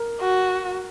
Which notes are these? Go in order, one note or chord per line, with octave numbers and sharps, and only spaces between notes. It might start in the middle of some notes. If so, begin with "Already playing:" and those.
Already playing: A#4
F#4